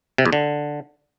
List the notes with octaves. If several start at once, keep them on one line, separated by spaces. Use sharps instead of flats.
C3
E2
D3